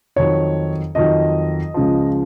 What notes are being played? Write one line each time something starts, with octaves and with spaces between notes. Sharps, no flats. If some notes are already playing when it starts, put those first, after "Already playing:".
F2 D#3 F#3 C#5
F2 D#3 F#3 D#5
C#2 C#3 F3